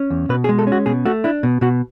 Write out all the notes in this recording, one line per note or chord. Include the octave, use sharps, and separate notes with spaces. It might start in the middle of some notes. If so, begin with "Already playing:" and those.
Already playing: C#4
E2
B2 B4
G#4
G#3
A4
C#4
F#4
B2 G#4
A3 F#4
D4 E4
B2
B2 F#4